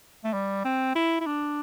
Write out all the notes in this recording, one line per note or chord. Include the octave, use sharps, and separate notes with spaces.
A3
G3
C4
E4
E4
D4